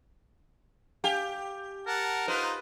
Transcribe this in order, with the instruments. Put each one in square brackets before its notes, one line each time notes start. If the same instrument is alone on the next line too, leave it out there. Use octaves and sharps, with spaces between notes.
[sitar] G4 [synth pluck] F5 G5 G#5
[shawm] A#4 [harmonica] F#5 A5
[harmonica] D#4 F4 C5 [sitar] B4 [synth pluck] E7